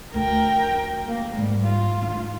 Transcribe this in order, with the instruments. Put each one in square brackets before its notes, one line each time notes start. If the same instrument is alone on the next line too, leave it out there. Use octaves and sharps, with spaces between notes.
[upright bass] D2 [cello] A#4 G5
[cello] A#3
[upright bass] G#2 [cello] G3
[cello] F4
[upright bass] D4 D#4